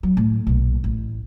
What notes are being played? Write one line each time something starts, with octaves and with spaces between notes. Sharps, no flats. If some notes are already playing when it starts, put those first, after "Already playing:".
F#3
A2
B1 A#2
A1